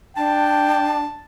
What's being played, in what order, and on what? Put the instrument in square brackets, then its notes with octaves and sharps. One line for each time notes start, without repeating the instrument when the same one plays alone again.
[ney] D4 [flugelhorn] G5 [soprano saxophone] A5